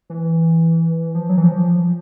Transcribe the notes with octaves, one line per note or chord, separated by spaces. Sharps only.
E3
F3
F#3
E3
F3